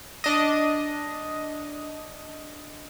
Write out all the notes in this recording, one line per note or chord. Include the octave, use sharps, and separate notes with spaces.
D4 D#5